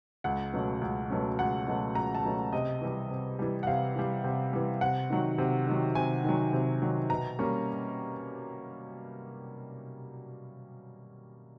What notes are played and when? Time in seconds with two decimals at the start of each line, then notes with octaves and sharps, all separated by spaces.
0.24 C#2 F#5
0.53 B2 F#3 A3 C#4
0.81 C#2
1.10 B2 F#3 A3 C#4
1.39 C#2 F#5
1.67 B2 F#3 A3 C#4
1.95 C#2 A#5
2.15 A5
2.24 B2 F#3 A3 C#4
2.52 C3 D#5
2.81 E3 G3
3.10 C3
3.39 E3 G3
3.63 F#5
3.67 C3 F5
3.95 E3 G3
4.24 C3
4.53 E3 G3
4.81 C3 F#5
5.10 D#3 F#3
5.38 C3
5.67 D#3 F#3
5.95 C3 G#5
6.24 D#3 F#3
6.53 C3
6.82 D#3 F#3
7.10 B2 A#5
7.39 G3 A#3 C#4